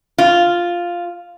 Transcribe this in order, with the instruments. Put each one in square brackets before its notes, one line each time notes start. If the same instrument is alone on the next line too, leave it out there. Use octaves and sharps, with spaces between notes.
[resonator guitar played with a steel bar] F4